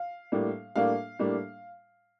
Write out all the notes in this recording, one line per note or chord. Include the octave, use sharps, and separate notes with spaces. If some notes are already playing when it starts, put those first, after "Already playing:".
Already playing: F5
A2 G3 A#3 D4
A2 G3 A#3 D4 F5
A2 G3 A#3 D4